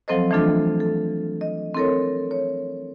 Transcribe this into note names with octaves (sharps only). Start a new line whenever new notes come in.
F3 F#3 C4 A4 C5 D#5
E3 F3 A3 D4 F4 A4
A4
D#5
C4 E4 A4 A#4 C#5
C#5